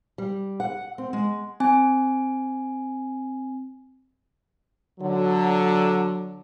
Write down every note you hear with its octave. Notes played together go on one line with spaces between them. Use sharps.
G3
F#5
C4
G#3
C4 G#5
D3 F#3